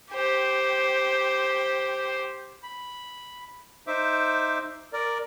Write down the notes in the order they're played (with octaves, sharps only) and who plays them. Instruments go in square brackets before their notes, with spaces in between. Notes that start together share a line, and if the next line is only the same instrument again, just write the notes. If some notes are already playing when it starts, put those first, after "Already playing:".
[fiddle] G4 C5
[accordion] B5
D#4 C5 E5 D6
A#4 D5